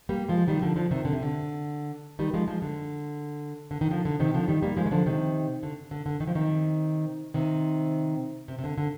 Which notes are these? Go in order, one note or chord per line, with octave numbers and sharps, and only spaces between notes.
G3 A#3
F3 G#3
D#3 G3
D3 F3
D3 F3
C3 D#3
D3
C3
D3
D#3 G3
F3 G#3
F3 G#3
D3
D3
D#3
D3 F3
D3
C3 D#3
D3 F3
D#3 G3
G3 A#3
F3 G#3
D#3
D3 F3
C3 D#3
D3
D3
D3
D#3
F3
C3 D#3
C3 D#3
C3
C3
D3
D3